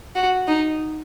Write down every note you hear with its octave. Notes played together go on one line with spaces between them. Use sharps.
F#4
D#4